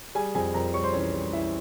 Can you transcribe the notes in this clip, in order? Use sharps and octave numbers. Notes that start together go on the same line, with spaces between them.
G3 G#4 G#5
F2 G#4 G#5
F2 A#4 A#5
G3 C#5 C#6
C5 C6
E3 C#4 C#5
G3
E3 E4 E5